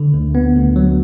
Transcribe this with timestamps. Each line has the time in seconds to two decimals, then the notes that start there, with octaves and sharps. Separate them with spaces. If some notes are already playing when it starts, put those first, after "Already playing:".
Already playing: D3
0.14 D2
0.35 B3
0.56 D2
0.76 F#3